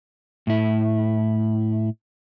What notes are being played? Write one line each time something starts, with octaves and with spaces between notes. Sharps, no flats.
A2 E4